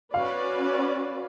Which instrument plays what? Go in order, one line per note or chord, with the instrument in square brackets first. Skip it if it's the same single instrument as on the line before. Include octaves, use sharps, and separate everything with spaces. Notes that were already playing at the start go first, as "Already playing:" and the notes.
[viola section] C#4 F#4 B4 D5 [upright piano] F5